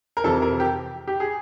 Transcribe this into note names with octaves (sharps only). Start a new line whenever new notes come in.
A#4
F2 C3 E3 A4
A#4
G4
G4
G#4